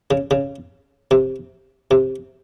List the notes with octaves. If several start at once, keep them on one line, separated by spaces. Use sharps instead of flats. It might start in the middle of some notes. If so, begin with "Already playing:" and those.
C#3
C#3
C3
C3